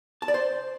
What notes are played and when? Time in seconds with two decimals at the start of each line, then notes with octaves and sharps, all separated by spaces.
0.22 A5
0.28 D5
0.34 C5